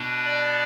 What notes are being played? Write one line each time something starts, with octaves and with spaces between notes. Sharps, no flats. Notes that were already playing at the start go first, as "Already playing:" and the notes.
Already playing: B2 B3 D4
D5